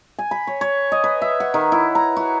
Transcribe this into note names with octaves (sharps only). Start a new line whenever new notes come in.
G#5
B5
C#5
C#5
D#5
B4
E5
F#5
D#3
E4
A#5
F#4